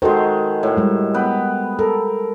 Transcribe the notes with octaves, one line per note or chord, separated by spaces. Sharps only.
D#3 G#3 F#4 A4 C5
A2
G3 G#3
B3 B4 G5
A4 A#4